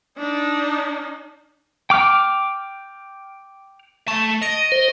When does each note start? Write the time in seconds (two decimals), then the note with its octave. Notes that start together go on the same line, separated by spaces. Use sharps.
0.19 D4 D#4
1.90 G5 D6 F6
4.08 A3 A5 C#6 A6
4.42 D#5 A#6 D7 F7
4.72 C5